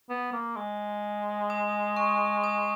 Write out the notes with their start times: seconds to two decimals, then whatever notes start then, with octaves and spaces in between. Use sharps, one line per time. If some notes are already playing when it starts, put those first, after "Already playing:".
0.09 B3
0.33 A#3
0.56 G#3
1.50 D#6
1.97 C#6
2.44 D#6